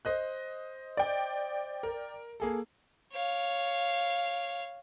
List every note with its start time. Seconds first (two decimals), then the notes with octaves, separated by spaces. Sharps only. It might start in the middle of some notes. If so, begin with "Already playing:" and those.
0.05 C5 D#5 F#6
0.97 D5 G5
1.83 A#4
2.40 A#3 G#4 A4
3.14 C#5 F5